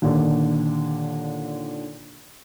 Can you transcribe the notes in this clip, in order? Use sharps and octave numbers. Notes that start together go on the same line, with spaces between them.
D#2 A#2 D3